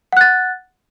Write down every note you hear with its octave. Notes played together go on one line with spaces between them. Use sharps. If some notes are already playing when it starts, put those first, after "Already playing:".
F#5 F#6 A6